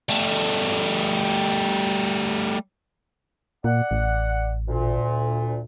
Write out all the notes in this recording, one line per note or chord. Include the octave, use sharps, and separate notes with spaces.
G3 A3
A#2 D5 F#5
A1
D2 A#2